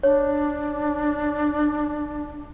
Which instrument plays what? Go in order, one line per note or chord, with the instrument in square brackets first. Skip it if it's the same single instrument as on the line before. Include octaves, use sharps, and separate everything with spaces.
[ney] D4 [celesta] C#5